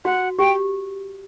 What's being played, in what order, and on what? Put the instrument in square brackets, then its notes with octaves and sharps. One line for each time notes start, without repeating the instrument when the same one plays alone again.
[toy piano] F#4 [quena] F#5
[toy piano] G4 [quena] G5